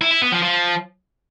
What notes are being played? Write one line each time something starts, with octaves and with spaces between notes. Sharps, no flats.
E4
E4
B3
F3
F3